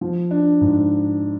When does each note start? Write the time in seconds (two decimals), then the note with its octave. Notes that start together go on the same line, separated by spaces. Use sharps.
0.01 F3
0.31 D4
0.61 G#2